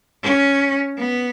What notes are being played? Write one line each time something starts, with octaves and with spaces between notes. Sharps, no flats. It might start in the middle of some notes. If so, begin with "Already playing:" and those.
C#4
B3